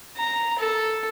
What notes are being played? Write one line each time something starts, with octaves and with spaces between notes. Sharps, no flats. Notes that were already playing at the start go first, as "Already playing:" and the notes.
A#5
A4